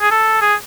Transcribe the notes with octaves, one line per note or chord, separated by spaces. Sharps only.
G#4
A4
G#4